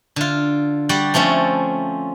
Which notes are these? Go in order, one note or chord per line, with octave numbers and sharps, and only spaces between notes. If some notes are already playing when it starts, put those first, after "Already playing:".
D3 F4
G3 F#4 D5
F3 A3 C4 C#4 A4